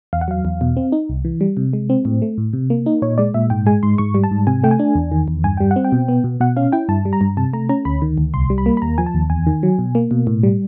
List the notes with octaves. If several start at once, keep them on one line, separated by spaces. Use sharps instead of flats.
E2 F5
F#5
F#3 F5
E2
B2
C4
D#4
C2
E3
G3
C3
G#3
C4
A2
A3
A2
C3
A#3
D#4
A#2 C#5
G#3 D5
A#2 E5
G#2 G5
G#3 G#5
G#2 C6
G#2 C#6
G3
A5
G#2
C3 G#5
A3 G5
G#5
D4
E2
D#3
E2
G2 G#5
G3 G5
F#5
C4
G5
B2
B3
B2
B2 F#5
C#4 F5
E4 G5
G2 A5
G3
A#5
G2
C3 A5
A3 A#5
C#4 A#5
D2 B5
D#3
D2
C2 C6
G3
B5
A#3
B5
D#2 A#5
F3 G#5
A5
D#2
E2 G#5
D#3
F#3
B2
A#3
B2
A2
G3